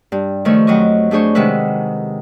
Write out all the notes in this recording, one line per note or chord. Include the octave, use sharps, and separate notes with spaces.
G2
D#3 F3 A3 C#5
F2 F#3 D#5 C#6
A3 D4 G#4 C5 C#5
C3 D#3 G#3 B4 E5 F#5